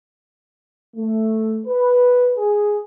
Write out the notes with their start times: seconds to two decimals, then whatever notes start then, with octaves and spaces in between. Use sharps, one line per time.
0.95 A3
1.66 B4
2.37 G#4